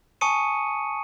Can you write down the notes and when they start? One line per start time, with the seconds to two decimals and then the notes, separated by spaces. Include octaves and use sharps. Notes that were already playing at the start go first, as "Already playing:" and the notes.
0.21 G#5 A5 C#6 D#6 C#7 D#7